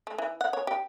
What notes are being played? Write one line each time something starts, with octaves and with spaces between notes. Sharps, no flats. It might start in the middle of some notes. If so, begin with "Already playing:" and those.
A3
E3
F#5
C#5
G4